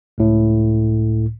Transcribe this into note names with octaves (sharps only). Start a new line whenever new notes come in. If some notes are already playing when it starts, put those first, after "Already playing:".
C#2 A2